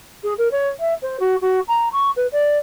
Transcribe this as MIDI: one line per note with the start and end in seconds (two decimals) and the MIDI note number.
0.23 0.34 68
0.38 0.48 70
0.51 0.68 73
0.79 0.94 76
1.02 1.17 72
1.20 1.36 66
1.41 1.60 66
1.68 1.88 82
1.92 2.10 85
2.16 2.27 71
2.32 2.57 74